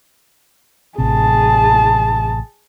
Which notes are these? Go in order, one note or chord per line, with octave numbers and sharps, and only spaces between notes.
A1 C3 G#4 A5